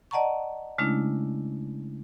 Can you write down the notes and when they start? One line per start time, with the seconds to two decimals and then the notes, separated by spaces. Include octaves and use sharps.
0.11 D5 D#5 F#5 A5 A#5 C#6
0.78 C#3 G#3 A3 C#4 D4 E4